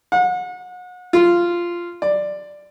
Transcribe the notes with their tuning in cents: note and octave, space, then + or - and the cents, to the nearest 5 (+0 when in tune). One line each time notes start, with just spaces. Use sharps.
F#5 -35
F4 -10
D5 +10